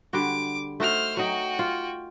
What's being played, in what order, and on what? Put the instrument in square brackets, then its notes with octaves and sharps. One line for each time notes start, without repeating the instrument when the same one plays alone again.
[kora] D3 G3 F#4 [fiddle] D6
[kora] A3 D#4 F#4 [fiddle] C5 F6
[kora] F#3 D#4 [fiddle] F#4 G5
[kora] F4